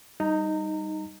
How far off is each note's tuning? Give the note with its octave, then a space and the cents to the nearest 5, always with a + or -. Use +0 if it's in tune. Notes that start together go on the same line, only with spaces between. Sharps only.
G3 +0 D#4 +0 A#5 -30